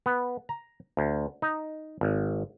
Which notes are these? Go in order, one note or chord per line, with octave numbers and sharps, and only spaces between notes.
B3
A#5
D2
D#4
G#1